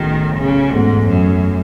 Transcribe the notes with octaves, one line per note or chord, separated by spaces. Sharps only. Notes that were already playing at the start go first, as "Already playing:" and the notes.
Already playing: B1 A2 D#3 C#4 G#4
C#3
E2 G#2 B2 A3 C#4 F#4
F#2